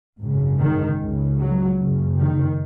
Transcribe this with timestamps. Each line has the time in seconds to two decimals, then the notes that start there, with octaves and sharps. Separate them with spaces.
0.19 G#1 F#2 C#3
0.58 D#3
0.99 C#2 C#3
1.39 F#3
1.79 F#1 F#2 C#3
2.19 D#3